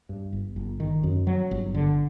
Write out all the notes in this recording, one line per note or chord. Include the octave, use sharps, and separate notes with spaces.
G2
G1
G1
D#3
F#2
F#3
G1
D3